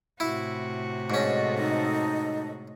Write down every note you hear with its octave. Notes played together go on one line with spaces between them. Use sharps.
A2 C3 E4 F#4
G#2 C#4 A4 D#5
D#4